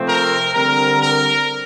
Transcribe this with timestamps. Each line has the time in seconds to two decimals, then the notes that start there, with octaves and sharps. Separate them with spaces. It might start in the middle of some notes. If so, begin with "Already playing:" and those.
Already playing: C3 F3 A3 C4
0.08 A#4
0.54 D3 G3 C4 A#4
1.01 A#4